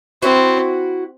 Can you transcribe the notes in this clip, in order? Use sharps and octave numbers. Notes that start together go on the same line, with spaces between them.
C4 E4 F#4